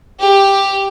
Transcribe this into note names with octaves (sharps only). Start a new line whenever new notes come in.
G4